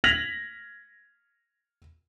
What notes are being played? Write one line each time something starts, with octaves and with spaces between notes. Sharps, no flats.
F6 G#6 A#6 B6 F7 F#7